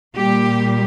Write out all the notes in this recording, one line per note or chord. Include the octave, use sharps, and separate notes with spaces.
A#2 G3 A#3 G4